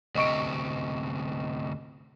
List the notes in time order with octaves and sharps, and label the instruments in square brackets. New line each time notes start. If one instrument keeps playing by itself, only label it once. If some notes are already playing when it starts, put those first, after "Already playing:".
[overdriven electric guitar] D2 C3 [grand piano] D#5 C#6 D7